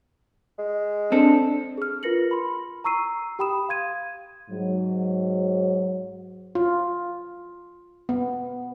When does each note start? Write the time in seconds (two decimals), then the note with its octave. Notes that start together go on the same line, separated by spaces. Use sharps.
0.59 G#3
1.12 C4 D4 A4
1.77 G#4 F6
2.03 F4 A#4 B4 A#6 C#7 F#7
2.31 B5 C6
2.84 A#5 C#6 E6 C7 D#7
3.39 G4 G5 B5 D#6 E7
3.69 F5 C6 G#6 D#7
4.51 G#2 F#3
6.55 F4
8.09 B3